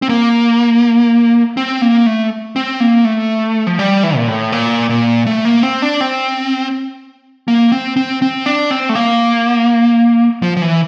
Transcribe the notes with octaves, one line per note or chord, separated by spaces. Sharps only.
C4
A#3
C4
A#3
A3
C4
A#3
A3
F3
G3
E3
A#2
A2
A#2
A#2
A3
A#3
C4
D4
C4
A#3
C4
C4
C4
D4
C4
A3
A#3
F3
F3
E3